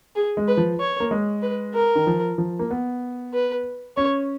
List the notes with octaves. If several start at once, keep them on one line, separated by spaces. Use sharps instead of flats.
G#4
G#3
B4
F3
C#5
A#3
G#3
B4
A#4
D#3
F3
F3
A#3
B3
B4
C#4 C#5